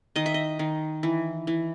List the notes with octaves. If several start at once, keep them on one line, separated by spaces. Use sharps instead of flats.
D#3 D#5
E5
D#5
D#3
E3
E3